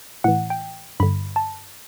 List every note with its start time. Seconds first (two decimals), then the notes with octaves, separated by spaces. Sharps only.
0.24 A2 E3 F#5
0.50 G5
1.00 G2 D3 B5
1.36 A5